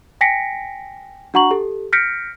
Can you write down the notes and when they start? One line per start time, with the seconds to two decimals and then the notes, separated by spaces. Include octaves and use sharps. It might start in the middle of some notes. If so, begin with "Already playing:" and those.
0.21 G5 G#5 A#6 B6 C#7 D7
1.34 D4 F#4 F#5 A#5 C#6 F#7
1.51 G4 A4
1.93 F6 G6 A#6 B6 C#7 D7